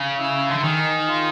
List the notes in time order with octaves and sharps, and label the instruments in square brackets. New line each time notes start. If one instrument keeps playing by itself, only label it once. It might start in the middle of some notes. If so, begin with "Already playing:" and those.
Already playing: [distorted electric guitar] C#3
[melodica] E4
[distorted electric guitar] D3
[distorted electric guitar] D#3 [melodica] G#4
[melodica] F4